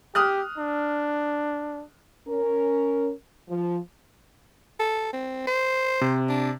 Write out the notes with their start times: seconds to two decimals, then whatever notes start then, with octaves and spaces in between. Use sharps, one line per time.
0.15 G4 D#6 F6 F#6
0.58 D4
2.28 C#4 A#4
3.49 F3
4.80 A4
5.13 C4
5.47 C5
6.01 C3
6.29 D4